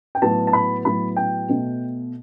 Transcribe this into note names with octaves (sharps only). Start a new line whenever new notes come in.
G5
A2 F#3 B3 A5
A5
B5
A2 F#3 B3 B5
G5
B2 A3